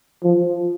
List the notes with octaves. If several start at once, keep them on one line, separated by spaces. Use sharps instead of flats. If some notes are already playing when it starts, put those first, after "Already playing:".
F3